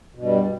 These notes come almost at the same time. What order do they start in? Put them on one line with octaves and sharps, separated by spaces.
B2 G2 G3